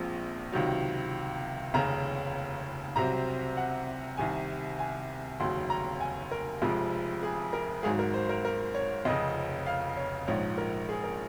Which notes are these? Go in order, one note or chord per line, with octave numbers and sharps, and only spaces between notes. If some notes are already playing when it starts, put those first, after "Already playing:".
Already playing: A#1 A#2 F3 G#3 C4
C#2 C3 D#3 F#3
F1 D#2 C#3 A#5
C2 C3 F#3 C4 A#5
F#5
C2 C3 D#3 G#5
G#5
F1 D#2 C#3 F#3 C6
A#5
G#5
A#4
F1 F2 C3 F3 G#3
G#4
A#4
G#1 G#2 F#3 G#4
A#4
C5
A#4
A#4
C#5
F1 F2 C#3 D#5
F5
C#5
A#1 G#2 F3 C#5
A#4
G#4
A#4